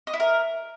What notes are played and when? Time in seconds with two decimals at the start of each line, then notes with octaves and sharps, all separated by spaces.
0.07 D#5
0.13 E4
0.20 A#4